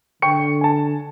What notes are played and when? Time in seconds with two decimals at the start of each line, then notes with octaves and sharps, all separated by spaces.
0.22 D3 G5 C#6 C#7
0.61 G#5 A5